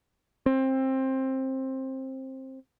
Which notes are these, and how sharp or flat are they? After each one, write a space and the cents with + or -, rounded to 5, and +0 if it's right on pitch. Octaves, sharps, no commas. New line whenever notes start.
C4 +20